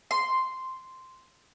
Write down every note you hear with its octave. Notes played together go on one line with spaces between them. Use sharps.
C6